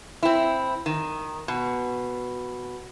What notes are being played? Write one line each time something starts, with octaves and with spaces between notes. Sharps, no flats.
C4 E4
D#3
B2